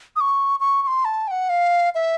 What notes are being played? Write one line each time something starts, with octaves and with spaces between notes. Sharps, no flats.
D#6
C#6
C#6
C#6
C6
A5
G5
F#5
F5
E5